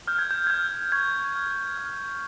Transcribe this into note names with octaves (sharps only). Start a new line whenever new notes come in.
F6 G6
G#6
G6
G#6
F6 G6
C#6 G#6
F6
F6